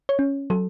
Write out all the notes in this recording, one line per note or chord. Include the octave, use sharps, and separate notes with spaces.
C#5
C#4
F#3 A4